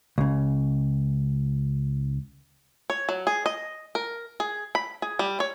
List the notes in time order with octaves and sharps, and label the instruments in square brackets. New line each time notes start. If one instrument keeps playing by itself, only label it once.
[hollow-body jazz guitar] C#2 C#3
[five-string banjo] C#5
F#3
G#4
D#5
A#4
G#4
B5
G#4
G3
C#5